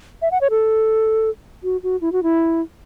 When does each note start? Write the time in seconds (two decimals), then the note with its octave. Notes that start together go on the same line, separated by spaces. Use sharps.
0.22 E5
0.31 F#5
0.41 C#5
0.50 A4
1.63 F#4
1.83 F#4
2.01 E4
2.12 F#4
2.23 E4